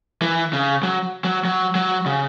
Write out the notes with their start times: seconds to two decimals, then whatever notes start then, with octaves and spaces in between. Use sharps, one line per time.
0.22 E3
0.53 C#3
0.83 F#3
1.24 F#3
1.45 F#3
1.75 F#3
2.06 C#3